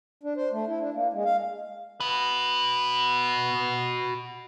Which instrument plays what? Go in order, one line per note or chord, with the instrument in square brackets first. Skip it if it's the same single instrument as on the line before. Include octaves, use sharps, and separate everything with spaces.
[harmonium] D4
C5
A3
E4
D4
A#3
G#3
F5
[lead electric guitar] F#4 B4